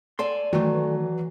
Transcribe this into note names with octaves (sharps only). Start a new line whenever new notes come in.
A4 D5 G#5 C6
D#3 E3 F#3 A3